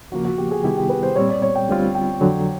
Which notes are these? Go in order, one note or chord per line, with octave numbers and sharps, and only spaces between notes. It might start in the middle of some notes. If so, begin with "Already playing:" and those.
D#2 C#3 F3 A#3 F#4
F#4
G4
G#4
C3 D#3 G3 B3 E4 G4
G4
B4
C5
A#2 G3 C4 C#5
D5
C#5
G5
D2 D3 G3 C4 F4
G5
F2 D3 F#3